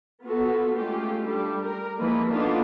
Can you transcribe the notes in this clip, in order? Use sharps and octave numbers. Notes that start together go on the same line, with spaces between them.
B3 F4 F#4 A4
G#3 A3 C#4 F4 G4
G3 D4 A4
A#4
E3 F3 G#3 A#3 B4
A#3 B3 D4 D#4 F4 A4